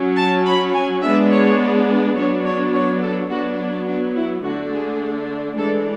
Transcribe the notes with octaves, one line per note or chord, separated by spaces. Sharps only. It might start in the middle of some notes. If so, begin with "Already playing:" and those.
Already playing: F#3 C#4
A5
B5
G#5
G#3 B3 D4 E5
C#5
F#3 B3 D4 C#5
C#5
C#5
A4
F#3 B3 D4 F#4
D4
E4
D3 A3 D4 F#4
G#4
E3 G#3 D4 A4